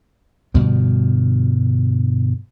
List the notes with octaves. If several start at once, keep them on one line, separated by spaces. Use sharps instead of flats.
G2 B2 D3 F3